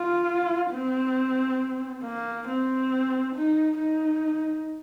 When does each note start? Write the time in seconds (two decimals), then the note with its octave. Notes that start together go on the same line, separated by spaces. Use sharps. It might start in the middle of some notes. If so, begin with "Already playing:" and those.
Already playing: F4
0.70 C4
2.03 A#3
2.48 C4
3.35 D#4
3.79 D#4